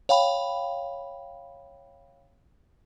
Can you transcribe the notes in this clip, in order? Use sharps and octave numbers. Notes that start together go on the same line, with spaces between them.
C#5 F5 G5 B5